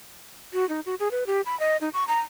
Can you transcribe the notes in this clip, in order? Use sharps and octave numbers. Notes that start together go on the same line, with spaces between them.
F#4
D#4
F#4
G#4
B4
G4
B5
D#5
D#4
C#6
A#5